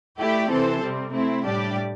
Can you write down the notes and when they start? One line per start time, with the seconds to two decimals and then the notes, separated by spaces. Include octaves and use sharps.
0.19 A3 E4 G4 D5
0.50 C3 E3 C4 A4 C5
0.81 C3 G3 C4
1.12 A3 C4 E4
1.44 A2 G3 D4 G4 D5